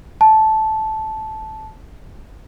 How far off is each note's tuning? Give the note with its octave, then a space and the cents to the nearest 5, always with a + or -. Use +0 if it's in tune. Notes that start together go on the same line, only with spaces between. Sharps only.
A5 -10